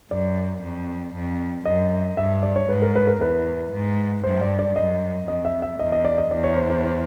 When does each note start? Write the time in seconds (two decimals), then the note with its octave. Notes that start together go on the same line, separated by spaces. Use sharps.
0.10 F#2 D5
0.62 F2
1.14 F2
1.65 F#2 D#5
2.17 G2 E5
2.43 D5
2.56 C#5
2.69 G#2 B4
2.82 A#4
2.96 B4
3.07 A#4
3.21 E2 B4
3.72 G#2
4.24 G2 C5
4.41 D5
4.59 D5
4.76 F#2 D#5
5.27 F2 D#5
5.45 E5
5.62 E5
5.79 E2 D#5
5.92 D#5
6.05 D5
6.18 D#5
6.31 E2 D5
6.44 C#5
6.57 C5
6.70 C5
6.83 C5